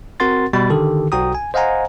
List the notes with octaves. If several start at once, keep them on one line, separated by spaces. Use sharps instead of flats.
C4 F#4 A#4 F#5 C6 A6
B2 G3 B5 A6
D3 D#3 G4 A4
B1 F#4 G5 A#5 D#6
G#5
C5 D#5 F5 F#5 G#5 A#5